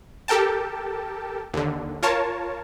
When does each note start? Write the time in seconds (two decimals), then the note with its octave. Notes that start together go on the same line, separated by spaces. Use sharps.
0.28 G4 A4 A#4 G5 A5
1.54 D#2 D3
2.03 F4 A#4 C#5 A5